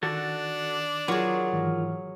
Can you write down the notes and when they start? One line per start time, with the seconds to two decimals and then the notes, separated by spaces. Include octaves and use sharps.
0.03 D#3 D4 F#4 A4
1.08 F#3 F4 G#4 A#4 C#6
1.53 G#2 D#3 E3